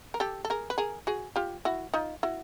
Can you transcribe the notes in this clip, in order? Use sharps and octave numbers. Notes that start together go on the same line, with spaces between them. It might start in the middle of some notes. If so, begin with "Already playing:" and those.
A#4
G4 A4
A4
G#4 A#4
B4
G#4 A#4
F#4 G#4
F4 G4
E4 F#4
D#4 F4
E4 F#4